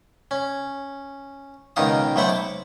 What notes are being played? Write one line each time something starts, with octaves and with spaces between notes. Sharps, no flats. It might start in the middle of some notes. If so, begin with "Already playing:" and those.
C#4
C#2 B2 D#3 D#4 F5 D#6
B1 F#3 A3 B4 C5 F#5
D6